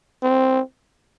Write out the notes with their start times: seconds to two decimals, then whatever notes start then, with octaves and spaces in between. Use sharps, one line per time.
0.23 C4